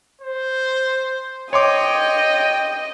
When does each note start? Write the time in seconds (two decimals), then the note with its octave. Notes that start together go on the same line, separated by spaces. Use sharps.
0.22 C5
1.53 C#5 D#5 G5 C6 D6